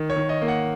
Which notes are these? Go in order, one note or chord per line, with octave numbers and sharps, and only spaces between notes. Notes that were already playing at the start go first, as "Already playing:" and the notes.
Already playing: D#3
C#5
D#3
D#5
A#3
F#5